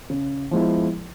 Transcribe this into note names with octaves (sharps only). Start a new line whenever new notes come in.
C#3
F3 G#3 B3 E4